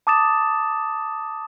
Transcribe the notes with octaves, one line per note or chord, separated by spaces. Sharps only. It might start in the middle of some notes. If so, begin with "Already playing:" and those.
A5 D6 D#6 A6 E7